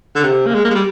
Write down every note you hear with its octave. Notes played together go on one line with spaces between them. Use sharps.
D3
C3
A#3
G#3
A#3
G#3
G3